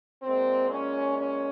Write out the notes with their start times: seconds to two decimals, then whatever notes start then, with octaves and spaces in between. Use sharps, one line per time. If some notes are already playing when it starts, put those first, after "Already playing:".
0.23 A#2 G#3 C4
0.70 C#4
1.17 C#4